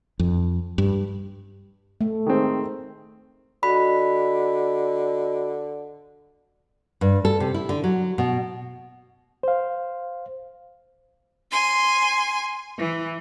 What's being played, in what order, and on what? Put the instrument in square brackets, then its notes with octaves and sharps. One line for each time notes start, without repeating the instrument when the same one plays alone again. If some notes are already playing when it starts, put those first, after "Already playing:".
[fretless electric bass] F2
G2
[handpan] A3
[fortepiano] D#3 G#3 C4
[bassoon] D3 [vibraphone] F#4 D#5 [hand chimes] B5
[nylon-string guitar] G2
A4
C3
E4
D3
F#3
B2
[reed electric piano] C5 F5
[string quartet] G#5 C6
E3